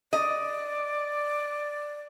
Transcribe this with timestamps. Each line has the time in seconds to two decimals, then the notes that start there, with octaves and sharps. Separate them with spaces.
0.13 D5 D#5